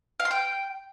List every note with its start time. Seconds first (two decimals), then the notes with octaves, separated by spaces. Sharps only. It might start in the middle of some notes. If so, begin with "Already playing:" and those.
0.20 F5
0.25 C6
0.31 G5